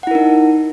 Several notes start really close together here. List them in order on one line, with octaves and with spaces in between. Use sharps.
F#5 E4 A#4 D#4